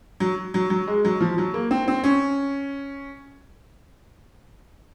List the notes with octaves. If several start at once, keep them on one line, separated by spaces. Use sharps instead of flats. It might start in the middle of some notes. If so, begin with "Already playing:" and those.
F#3
F#3
F#3
G#3
F#3
F3
F#3
A#3
C4
C4
C#4